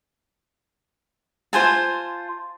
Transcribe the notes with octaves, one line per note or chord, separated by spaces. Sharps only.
F4 C5 G#5 A5